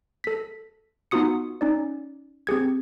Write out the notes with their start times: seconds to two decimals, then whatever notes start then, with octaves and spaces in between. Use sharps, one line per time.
0.24 A4 B6
1.11 B3 D#4 F4 F#4 D#6 C#7
1.61 C#4 D#4 D5
2.47 C4 G4 G#4 G#6